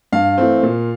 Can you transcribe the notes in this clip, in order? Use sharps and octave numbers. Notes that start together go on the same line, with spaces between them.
G2 F5
E3 A3 C4
A#2